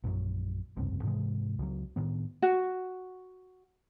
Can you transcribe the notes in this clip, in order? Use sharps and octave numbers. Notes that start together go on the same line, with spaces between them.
A#1 F#2 F3 F#3
F1 C#2 G2 C3
G#2 C3 E3 G#3
C#2 F#3
A2 D#3 B3
F#4